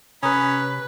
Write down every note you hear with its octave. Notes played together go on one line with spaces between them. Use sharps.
C3 C#4 B4 A#5 B5 D#6